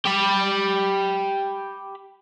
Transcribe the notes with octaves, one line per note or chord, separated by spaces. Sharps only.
G4 B5